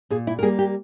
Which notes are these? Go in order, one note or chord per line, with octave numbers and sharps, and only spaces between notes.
A#2 G#4
E4
A#4
G3 A#3 G#4
G4